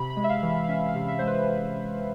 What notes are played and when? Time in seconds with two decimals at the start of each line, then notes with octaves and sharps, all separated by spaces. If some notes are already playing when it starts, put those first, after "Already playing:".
Already playing: C3 B5
0.10 B5
0.16 G#3
0.24 E5
0.29 F5
0.43 E3
0.49 E5
0.64 F5
0.69 C#4 E5
0.88 F5
0.95 C3
1.08 E5
1.19 G#3 C5
1.27 B4